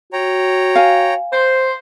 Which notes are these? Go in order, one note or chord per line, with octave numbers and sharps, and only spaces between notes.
F#4 C#5 G5 A#5
F5 G#5
C5